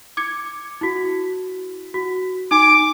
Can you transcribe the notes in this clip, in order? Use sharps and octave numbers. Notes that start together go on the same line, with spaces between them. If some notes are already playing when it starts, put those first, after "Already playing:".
D6 G#6 C#7
E4 F#4
F#4
D#4 G#5 D6